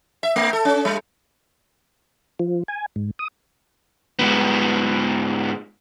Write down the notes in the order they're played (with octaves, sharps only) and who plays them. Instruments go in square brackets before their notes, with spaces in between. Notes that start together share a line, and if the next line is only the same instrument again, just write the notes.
[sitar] E5
A3
A4
C#4
G3
[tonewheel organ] F3
G#5
G#2
D#6
[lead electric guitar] G#2 B3